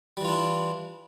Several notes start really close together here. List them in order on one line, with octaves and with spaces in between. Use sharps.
G3 E3 F4 D4 E4